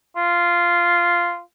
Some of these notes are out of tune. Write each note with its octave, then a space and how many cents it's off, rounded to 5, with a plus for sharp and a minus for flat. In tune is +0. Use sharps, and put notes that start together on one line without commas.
F4 -10